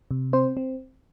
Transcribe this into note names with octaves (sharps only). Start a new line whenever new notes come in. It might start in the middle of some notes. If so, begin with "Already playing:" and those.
C3
C4 C5
C4